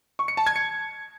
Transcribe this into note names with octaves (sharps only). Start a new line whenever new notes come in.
C#6
C#7
A5
G#6
C#7